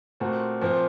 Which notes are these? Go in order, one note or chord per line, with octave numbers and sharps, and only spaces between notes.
A#2 A3 C4 F#4
A#2 F3 C4